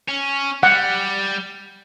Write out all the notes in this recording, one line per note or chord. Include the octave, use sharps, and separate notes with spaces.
C#4
G3 F#5